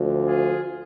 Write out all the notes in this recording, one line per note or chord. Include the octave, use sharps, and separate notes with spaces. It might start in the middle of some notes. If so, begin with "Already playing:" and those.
Already playing: D2 D3 F3
F4 G#4